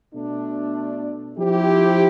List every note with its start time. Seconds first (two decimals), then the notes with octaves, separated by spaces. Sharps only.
0.14 B2 A3 D4
1.38 F3 C4 E4 G4